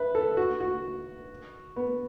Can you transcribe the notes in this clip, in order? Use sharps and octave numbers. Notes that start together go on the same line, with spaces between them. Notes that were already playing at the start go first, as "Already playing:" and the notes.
Already playing: B4 E5
A4
F#4
F#4
B3